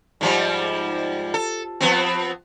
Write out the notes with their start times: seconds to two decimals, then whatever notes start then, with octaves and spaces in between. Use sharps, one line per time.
0.21 G#2 F3 G3
1.34 A4
1.81 F3 B3 C4